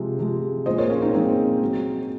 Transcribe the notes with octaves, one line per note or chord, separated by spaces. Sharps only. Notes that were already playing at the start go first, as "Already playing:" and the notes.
Already playing: C3 F3 G#3
C3 F3 G#3
A#2 F3 G#3 C5 D#5
A#4 C#5
C#4 F4
C4 D#4
A#2 F3 G#3 C4 D#4
G#2 F#3